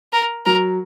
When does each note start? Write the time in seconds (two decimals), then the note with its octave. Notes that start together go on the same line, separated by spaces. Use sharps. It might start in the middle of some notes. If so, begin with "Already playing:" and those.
0.13 A#4
0.45 F#3 A#4